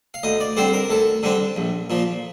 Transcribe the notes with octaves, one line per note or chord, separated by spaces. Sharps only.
F5
D2 D#5
D5
D3 G3 C4 C5
A#4
D2 A4
D3 G3 C4
A#1
A#2 F3